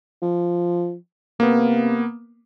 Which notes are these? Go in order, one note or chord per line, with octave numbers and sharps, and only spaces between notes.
F3
C3 A#3 B3